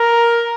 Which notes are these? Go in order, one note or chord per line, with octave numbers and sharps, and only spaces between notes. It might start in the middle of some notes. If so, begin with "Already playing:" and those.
Already playing: A#4